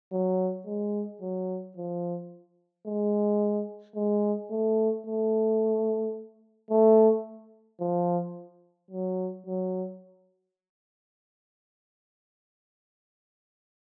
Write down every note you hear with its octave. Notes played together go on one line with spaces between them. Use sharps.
F#3
G#3
F#3
F3
G#3
G#3
A3
A3
A3
F3
F#3
F#3